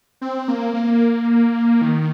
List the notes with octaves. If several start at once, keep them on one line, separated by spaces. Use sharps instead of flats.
C4
A#3
A#3
D#3